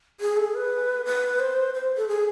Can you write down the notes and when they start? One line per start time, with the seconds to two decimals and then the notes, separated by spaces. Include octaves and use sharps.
0.21 G#4
0.37 A4
0.55 B4
1.05 B4
1.40 C5
1.74 C5
1.97 A4
2.08 G#4